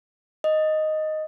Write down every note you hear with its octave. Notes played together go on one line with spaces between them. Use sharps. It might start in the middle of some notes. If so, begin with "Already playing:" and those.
D#5